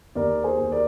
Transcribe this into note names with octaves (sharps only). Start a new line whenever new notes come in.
D#2 A#4 D5
G#4 C5
D#2
A#4 D5